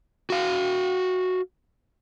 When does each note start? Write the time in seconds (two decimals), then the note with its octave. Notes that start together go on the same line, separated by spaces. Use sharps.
0.30 F#4 F5